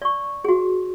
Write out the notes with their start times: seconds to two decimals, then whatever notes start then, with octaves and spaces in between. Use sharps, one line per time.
0.02 D5 C#6
0.44 F#4 G#4